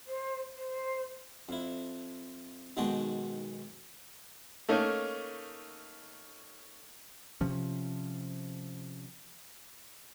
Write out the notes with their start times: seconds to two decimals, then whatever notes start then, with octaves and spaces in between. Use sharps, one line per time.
0.07 C5
0.55 C5
1.49 F2 E4
2.77 B1 B2 D#3 G#3 F#4 G5
4.69 A3 A#3 C#4 D#4
7.41 C3 F3 C#4